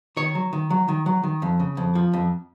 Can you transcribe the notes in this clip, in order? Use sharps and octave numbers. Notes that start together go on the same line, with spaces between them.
D#3 C#5
F#3
D#3
F#3
D#3
F#3
D#3
F2
C#3
F2
F3
F2